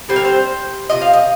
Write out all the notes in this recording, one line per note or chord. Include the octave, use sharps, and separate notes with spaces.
D3 G3 C4 C5
A#4
C5
C3 F3 D#5
F5
D#5